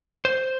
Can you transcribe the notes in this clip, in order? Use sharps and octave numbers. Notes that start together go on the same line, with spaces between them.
C5